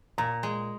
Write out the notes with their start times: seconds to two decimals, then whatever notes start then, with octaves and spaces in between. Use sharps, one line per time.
0.18 A#2 A#5
0.43 G#3